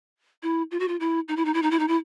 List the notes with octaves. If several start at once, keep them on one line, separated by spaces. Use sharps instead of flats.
E4
F4
F#4
F4
E4
D#4
E4
D#4
E4
D#4
E4
D#4
E4